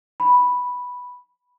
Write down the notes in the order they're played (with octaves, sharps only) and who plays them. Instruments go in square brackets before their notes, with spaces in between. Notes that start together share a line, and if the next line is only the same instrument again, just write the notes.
[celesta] B5